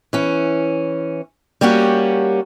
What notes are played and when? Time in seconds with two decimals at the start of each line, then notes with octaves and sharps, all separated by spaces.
0.13 E3 C#4
1.61 G3 A#3 C#4 F#4 G4